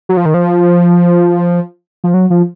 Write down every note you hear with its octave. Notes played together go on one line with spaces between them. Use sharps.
F#3
F3
D#3
F3
F3
F#3
F3